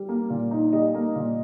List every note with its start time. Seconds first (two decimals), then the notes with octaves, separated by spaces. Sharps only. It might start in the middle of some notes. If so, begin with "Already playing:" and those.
Already playing: G3
0.09 A#3
0.30 A#2
0.51 D#4
0.73 G3 D#5
0.94 A#3
1.16 A#2